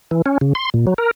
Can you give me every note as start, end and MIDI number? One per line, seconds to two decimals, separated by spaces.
0.11 0.22 52
0.26 0.38 61
0.41 0.53 49
0.55 0.70 84
0.74 0.86 46
0.87 0.94 54
0.98 1.11 70